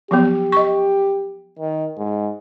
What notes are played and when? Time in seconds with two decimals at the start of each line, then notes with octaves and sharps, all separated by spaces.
0.11 F3 F#3 B3 G4
0.52 D#5 C#6
1.59 D#3
1.97 G#2